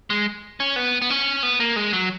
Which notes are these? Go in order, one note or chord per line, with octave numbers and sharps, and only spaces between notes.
G#3
C#4
B3
B3
C#4
B3
A#3
G#3
F#3